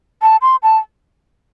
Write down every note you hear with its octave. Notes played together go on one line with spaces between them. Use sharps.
A5
C6
A5